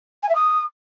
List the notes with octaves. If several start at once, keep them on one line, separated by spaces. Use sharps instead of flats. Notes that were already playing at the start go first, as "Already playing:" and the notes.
G#5
E5
D#6